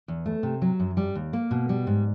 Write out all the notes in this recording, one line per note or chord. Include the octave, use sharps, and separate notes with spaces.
E2
A3
C3
F#3
F#2
G3
D#2
A#3
B2
G3
G#2